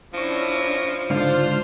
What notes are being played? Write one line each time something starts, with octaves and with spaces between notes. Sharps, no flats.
F3 C#4 D4 E4 C#6 A#6
C#2 G#2 D3 D4 F4 C5 F5